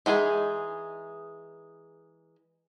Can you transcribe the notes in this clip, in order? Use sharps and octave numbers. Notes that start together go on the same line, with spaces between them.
E3 G#3 D#4 G#4